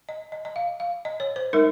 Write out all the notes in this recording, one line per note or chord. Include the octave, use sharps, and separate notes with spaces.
D#5
D#5
D#5
F5
F5
D#5
C#5
C5
G#3 D#4 A#4